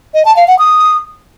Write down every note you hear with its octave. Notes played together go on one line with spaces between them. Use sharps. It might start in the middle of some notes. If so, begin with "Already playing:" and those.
D#5
A5
F5
F#5
D#6